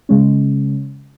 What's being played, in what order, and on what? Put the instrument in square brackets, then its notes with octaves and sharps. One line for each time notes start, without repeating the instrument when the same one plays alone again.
[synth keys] C#3 G#3 C#4